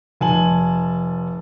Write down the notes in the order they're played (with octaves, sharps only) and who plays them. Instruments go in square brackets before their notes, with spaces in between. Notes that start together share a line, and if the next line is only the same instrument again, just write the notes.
[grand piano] F1 G#5 A5 F#7